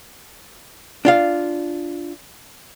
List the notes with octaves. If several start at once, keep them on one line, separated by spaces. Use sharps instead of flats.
D4 F4 F5